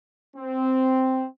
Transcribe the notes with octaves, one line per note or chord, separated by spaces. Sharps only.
C4